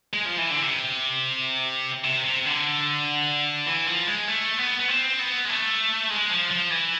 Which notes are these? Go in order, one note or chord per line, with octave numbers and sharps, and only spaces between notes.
G#3
F3
E3
D3
C3
C3
C3
D3
E3
F3
G#3
A3
B3
B3
C4
B3
G#3
A3
G#3
F3
F3
E3